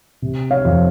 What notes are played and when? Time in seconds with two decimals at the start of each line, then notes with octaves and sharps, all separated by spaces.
0.22 C3
0.51 C#5 F5
0.65 F2